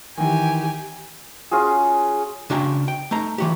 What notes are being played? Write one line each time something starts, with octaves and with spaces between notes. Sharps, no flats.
D#3 E3 G4 G#5
C#4 F4 F#4 G#4
C#3 D4 F#4 G5 G#5 A#5
G5
A3 D#4 A#5
E3 F#4 G4